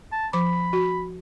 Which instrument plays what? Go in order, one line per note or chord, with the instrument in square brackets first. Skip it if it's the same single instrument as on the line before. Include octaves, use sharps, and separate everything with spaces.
[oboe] A5
[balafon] F3 D6 [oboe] B5
[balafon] F#4